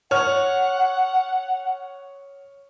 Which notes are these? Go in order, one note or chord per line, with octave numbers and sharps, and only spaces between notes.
C#5 F#5 F6